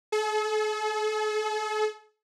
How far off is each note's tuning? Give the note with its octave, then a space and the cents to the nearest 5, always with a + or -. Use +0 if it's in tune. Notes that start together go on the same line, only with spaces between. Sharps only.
A4 -45